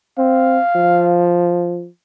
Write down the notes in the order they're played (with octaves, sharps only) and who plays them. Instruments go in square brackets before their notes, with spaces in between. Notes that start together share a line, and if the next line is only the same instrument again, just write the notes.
[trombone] C4 [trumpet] F5
[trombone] F3